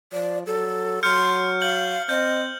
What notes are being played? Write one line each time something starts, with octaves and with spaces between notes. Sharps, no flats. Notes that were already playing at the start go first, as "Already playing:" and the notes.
F3 D5
F#3 A4
F#3 C6 F6 G6 C#7
F5 G6 F#7
C4 D#5 G6